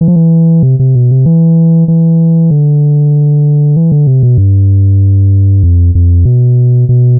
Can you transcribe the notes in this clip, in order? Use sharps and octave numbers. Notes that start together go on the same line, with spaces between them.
E3
F3
E3
C3
C3
B2
C3
E3
E3
D3
E3
D3
C3
B2
G2
F2
F2
B2
B2